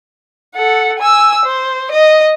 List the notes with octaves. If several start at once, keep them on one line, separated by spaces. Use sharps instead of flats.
A4 F#5
G#5 E6
C5
D#5